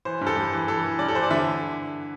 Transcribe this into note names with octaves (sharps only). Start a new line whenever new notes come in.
E3 C5
G2
A4
G2
E3
E3 A4
E3
G2 D5
A4
E3 C5
D5
D3 E5